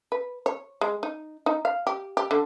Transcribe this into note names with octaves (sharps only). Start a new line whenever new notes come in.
B4
C#5
G#3
D#4
D#4
F5
G4
G4
D3